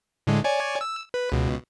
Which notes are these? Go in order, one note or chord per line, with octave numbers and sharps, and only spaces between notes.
A2 D3 G#3
C#5 D5 G#5
E6
B4
C#2 B2